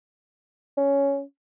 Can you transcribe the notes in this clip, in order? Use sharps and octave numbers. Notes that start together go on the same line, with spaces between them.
C#4